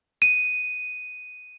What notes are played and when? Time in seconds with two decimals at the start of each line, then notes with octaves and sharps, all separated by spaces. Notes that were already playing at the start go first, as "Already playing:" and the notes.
0.22 D#7